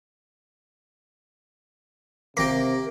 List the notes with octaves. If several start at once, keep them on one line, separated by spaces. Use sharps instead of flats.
G#1 C3 A#3 G5 A#6